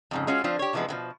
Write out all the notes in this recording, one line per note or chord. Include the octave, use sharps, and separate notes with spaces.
F2 G#2 C#3
G#3 C#4 F4 F#4
F3 C4 D4 F4
G4 C#5
C3 E3 F3 G#3 B3
B2 D3 F3